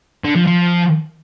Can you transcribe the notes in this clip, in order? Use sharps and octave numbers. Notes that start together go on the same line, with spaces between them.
D3
F3
F3